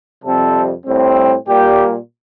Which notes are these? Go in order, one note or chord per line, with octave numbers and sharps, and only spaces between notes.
F2 C3 G3 C4 A4
A2 G3 C4
A#2 G3 A#3 G4